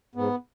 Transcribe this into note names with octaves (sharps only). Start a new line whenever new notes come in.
G#2 B3